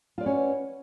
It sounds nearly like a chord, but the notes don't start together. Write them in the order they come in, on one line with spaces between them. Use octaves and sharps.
F4 D5 B4 C#4 F#4